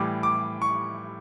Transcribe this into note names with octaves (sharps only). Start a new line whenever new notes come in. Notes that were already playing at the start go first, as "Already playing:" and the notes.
Already playing: A2 E3 G3 D6
D6
C#6